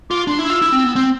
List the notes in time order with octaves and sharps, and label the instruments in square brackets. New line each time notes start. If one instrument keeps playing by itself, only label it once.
[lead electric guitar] F4 [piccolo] D6
[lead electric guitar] D4 [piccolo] C6
[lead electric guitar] E4
[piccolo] E6
[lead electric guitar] F4
E4
C4
B3
C4